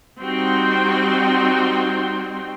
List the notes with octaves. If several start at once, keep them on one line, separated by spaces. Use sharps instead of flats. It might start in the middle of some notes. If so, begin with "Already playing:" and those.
G3 C4 D#4 F#4 G5 C6